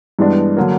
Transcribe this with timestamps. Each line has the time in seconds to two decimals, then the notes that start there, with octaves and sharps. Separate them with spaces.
0.19 G2 E3 G#3 B3 D4
0.57 D3 F#3 A#3